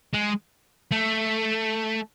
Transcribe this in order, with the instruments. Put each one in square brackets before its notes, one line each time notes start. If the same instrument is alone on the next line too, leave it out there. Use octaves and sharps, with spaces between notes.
[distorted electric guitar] G#3
A3